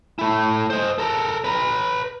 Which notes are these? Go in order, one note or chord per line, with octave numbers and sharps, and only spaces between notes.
A3 E4
C5 D#5
A4 A#4
B4 A#5